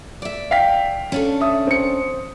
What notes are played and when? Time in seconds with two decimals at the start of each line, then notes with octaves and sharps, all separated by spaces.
0.22 D5 E5
0.51 F5 G5 B6
1.12 C#4 D4 A4
1.41 E5 D#6
1.67 C4 C#7